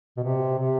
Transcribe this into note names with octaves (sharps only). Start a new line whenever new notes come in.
B2
C3
C3